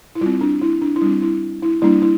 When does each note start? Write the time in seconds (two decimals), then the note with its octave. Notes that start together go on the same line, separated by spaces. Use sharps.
0.15 E4
0.21 G3 C4 F4
0.41 D4
0.61 E4
0.81 D4
0.96 E4
1.01 G3 C4 D4
1.22 E4
1.62 E4
1.82 G3 A#3 D4 E4
2.02 E4